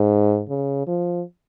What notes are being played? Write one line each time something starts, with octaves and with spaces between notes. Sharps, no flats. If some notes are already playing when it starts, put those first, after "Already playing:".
Already playing: G#2
C#3
F3